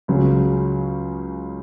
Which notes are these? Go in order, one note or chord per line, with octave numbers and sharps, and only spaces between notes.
C#2 C#3 F#3